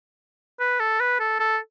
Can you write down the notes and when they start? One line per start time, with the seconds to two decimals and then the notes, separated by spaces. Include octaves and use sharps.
0.60 B4
0.80 A4
1.00 B4
1.20 A4
1.40 A4